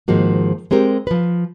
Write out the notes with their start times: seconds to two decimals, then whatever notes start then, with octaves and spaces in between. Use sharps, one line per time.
0.08 G#2 D#3 F3 G#3 A#3 F#4
0.71 G#3 C4 G4 A#4
1.07 F3 B4